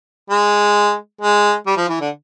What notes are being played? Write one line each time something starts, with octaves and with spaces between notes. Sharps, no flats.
G#3
G#3
G3
F3
E3
D3